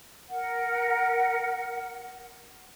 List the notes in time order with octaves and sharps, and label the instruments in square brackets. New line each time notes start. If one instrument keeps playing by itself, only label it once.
[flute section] A#4 F#5